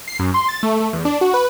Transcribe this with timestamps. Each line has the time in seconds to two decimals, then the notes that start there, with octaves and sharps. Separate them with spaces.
0.08 C7
0.19 F#2
0.34 C6
0.48 A6
0.63 A3
0.80 A3
0.93 E2
1.05 D4
1.21 F#4
1.34 B4